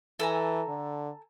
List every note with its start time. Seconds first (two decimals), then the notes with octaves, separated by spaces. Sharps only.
0.20 E3 A4 G#5 A#5
0.68 D3